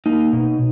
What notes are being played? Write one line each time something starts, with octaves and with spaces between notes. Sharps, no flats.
A#3 D#4
B2